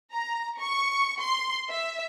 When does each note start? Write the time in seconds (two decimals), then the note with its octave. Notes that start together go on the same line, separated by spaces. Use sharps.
0.13 A#5
0.60 C#6
1.21 C6
1.70 E5